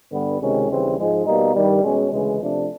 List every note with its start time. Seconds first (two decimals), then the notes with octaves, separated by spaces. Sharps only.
0.13 G2 D3 G3 B3
0.41 C#2 C3 D#3 G#3 C#4
0.70 D#2 C#3 E3 G3 C4
0.99 G#2 F3 G#3
1.27 B2 G3 A#3 D#4
1.55 G2 D#3 G3
1.83 B2 G#3 C#4
2.12 D2 C#3 E3 G#3
2.41 C3 F3 A3 D4